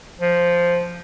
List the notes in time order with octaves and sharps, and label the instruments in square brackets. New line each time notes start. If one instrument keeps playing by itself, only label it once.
[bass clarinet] F3